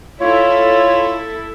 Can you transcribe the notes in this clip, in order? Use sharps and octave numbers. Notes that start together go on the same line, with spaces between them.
E4 F4 A4 C#5